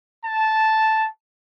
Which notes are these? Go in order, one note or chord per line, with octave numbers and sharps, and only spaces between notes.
A5